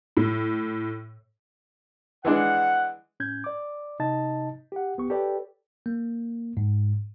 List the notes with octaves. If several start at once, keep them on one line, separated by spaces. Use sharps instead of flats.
A2
E3 G#3 D4 F#5
A2 C#4 G6 G#6
D5 D6
C3 D#4 D#5 A5 A6
G4 F#5
C#2 B3 G4 C#6
G4 A4 B4 C#5 D5 G5
A#3
G#2